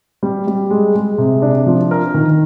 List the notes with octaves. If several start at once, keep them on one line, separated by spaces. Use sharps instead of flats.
G3
G3
G#3
G#3
C3
D4
F3
A#4
D#3